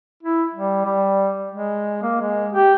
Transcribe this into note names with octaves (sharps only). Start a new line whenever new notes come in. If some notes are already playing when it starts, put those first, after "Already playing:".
E4
G3
G3
G#3
A#3
G#3
G4